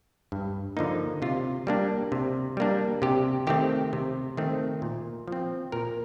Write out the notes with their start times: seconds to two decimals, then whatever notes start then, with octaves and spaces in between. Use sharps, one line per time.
0.32 G2
0.77 D3 F3 A#3 D#4
1.22 C3 F4
1.67 G3 A#3 D4
2.12 C3
2.57 G3 A#3 D4
3.02 C3 G4
3.47 D#3 A3 C4 G4
3.93 C3
4.37 D#3 A3 C4
4.82 A#2
5.28 F3 C4
5.72 A#2 A#4